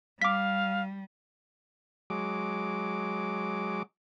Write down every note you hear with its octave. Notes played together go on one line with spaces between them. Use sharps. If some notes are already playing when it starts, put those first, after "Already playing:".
G3 F5 D6 B6
F#3 G#3 D6